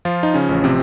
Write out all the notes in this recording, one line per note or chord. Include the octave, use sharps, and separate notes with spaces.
F3 F4
D#4
C#3 C#4
A1
C3 C4